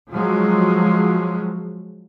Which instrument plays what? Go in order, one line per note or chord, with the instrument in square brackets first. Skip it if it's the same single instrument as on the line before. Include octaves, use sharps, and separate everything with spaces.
[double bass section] F3 F#3 G#3